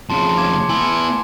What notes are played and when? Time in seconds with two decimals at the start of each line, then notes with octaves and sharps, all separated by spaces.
0.10 F2 C#3 A5 C6
0.37 D6 G#6 E7
0.70 B3 E4 G#5 C6